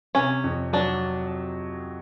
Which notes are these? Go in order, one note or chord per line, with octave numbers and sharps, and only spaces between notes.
C3 C#4
F2
F#3 D4